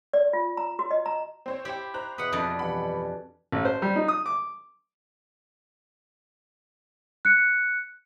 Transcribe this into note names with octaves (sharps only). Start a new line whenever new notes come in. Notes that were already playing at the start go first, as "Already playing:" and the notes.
D5
F4
A#5
F#4
D#5
A#5
C4 C5 C#5
E4 G4 C5 G5
C5 A#5 F#6
E2 B2 B4 F#5 D#6
F2 D4 D#5
G2 B2 E3 F#5 B5
A1
C5
G3
D#4
D#6
D6
F#6 C#7